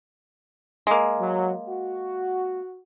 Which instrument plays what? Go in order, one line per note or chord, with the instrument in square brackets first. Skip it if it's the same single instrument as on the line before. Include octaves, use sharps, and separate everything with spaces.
[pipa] G#3 A#3
[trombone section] F#3
F#4